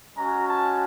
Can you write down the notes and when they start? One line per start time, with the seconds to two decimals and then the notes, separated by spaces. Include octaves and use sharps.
0.16 G#3 C#4 F#4 A#5
0.48 A5